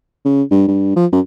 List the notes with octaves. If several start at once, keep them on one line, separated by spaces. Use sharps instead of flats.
C#3
G2
G2
F3
F#2